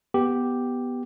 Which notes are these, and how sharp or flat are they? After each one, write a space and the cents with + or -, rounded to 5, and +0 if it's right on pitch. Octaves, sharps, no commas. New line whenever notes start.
B3 -5 G4 +0